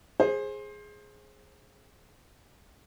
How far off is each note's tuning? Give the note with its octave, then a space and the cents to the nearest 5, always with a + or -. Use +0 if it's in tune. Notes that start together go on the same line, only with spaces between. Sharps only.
G#4 +0 C5 +25